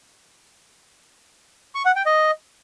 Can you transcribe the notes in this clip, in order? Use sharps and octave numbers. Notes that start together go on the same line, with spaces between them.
C#6
F#5
G5
D#5